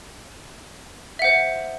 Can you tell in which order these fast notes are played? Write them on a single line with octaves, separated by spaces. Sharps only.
E5 F#5 C5